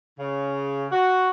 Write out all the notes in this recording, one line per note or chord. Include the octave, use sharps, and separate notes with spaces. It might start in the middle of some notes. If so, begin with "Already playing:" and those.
C#3
F#4